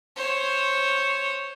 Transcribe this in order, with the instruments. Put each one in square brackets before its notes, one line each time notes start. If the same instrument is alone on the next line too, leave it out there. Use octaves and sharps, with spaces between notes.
[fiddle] C5 C#5